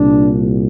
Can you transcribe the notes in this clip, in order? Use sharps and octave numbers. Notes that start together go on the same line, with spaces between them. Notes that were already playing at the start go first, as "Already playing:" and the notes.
Already playing: C2 A#2 D4